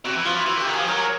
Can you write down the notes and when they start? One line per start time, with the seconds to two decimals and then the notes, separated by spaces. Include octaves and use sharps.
0.05 C3 F#4
0.16 E3
0.26 F3 F4
0.36 E3
0.46 E3 F#4
0.57 D3 G4
0.66 D#3
0.74 F3 G#4
0.88 F#3 A#4